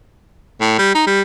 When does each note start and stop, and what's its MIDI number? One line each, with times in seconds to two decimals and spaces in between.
0.61 0.74 45
0.79 0.93 55
0.95 1.03 63
1.07 1.22 55